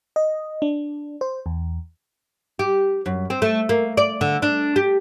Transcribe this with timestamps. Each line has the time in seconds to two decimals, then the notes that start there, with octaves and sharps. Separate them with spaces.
0.16 D#5
0.62 D4
1.21 C5
1.46 E2
2.59 G4
3.06 F#2
3.30 C4
3.42 A3
3.69 A#3
3.97 D5
4.21 D3
4.42 D4
4.76 G4